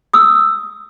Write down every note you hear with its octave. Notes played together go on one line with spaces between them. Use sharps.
D#6 E6